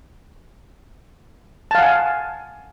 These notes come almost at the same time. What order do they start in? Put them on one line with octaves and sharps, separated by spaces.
A5 F5 F#5 G#5